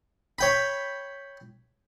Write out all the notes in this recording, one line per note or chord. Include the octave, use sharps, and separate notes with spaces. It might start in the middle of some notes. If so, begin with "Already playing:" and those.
C#5 G5 B5